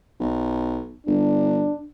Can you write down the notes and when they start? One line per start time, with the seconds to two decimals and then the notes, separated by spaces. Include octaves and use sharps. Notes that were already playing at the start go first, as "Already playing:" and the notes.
0.20 B1
1.07 G1 D4